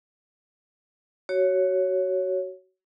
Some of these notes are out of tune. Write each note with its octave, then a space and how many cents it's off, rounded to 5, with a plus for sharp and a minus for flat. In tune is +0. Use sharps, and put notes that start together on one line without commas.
F#4 +20 C#5 +0